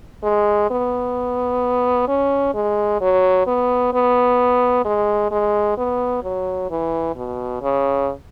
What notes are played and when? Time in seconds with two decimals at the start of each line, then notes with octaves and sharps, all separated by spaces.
0.24 G#3
0.71 B3
2.08 C#4
2.54 G#3
3.01 F#3
3.47 B3
3.93 B3
4.85 G#3
5.31 G#3
5.77 B3
6.23 F#3
6.70 E3
7.16 B2
7.62 C#3